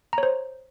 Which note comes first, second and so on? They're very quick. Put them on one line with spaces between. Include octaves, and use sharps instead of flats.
A#5 C#5 C5